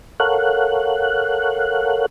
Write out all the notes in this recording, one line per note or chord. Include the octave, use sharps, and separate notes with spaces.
A4 A#4 C#5 F5 F#5 F#6